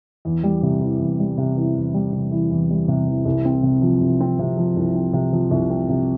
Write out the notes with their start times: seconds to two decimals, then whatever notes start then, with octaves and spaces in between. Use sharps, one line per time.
0.25 E2
0.43 G3
0.63 C3
0.81 E3
1.00 E2
1.20 G3
1.38 C3
1.56 E3
1.75 E2
1.94 G3
2.13 C3
2.31 E3
2.50 E2
2.70 G3
2.88 C3
3.07 E3
3.25 C2
3.45 C4
3.63 C3
3.82 F3
4.01 C2
4.20 C4
4.39 C3
4.57 F3
4.77 C2
4.95 C4
5.13 C3
5.33 F3
5.51 C2
5.70 C4
5.89 C3